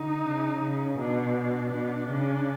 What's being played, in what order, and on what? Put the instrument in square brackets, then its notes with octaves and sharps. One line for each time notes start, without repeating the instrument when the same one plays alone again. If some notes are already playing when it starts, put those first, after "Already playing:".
Already playing: [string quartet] D3 [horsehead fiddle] D#4
[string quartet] C#3
C#3
[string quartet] B2 [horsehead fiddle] D4
[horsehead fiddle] D4
[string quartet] B2
C#3